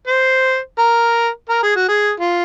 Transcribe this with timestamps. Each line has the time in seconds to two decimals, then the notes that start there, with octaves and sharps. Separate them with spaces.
0.08 C5
0.79 A#4
1.50 A#4
1.63 G#4
1.76 F#4
1.89 G#4
2.20 F4